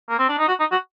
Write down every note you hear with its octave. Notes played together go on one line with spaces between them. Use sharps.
A#3
C4
D4
D#4
F#4
D#4
F#4